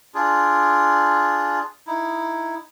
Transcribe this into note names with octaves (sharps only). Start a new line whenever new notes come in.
D4 F4 G#4
D#4 E4